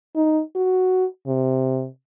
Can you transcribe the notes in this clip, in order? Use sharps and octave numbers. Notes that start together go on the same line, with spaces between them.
D#4
F#4
C3